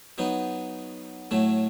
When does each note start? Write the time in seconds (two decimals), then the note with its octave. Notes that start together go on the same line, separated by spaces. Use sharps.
0.18 F#3 B3 D#4
1.31 A2 F#3 A3